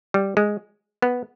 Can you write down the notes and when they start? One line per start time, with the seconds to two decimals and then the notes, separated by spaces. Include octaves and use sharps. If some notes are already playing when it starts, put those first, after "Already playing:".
0.14 G3
0.37 G#3
1.02 B3